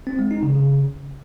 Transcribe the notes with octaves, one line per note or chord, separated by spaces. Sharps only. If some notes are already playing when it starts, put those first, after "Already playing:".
C4
G#3
D#4
C#3
C#3